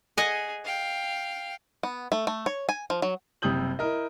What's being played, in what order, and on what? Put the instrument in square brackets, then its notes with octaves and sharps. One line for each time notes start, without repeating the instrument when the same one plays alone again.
[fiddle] G#4 [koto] D#5 F#5 G#5
[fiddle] F5 G5
[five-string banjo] B3
A3
A3
C#5
G#5
F3
F#3
[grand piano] F#1 C3 G3 D#6 G6 F#7
E4 A#4 D#5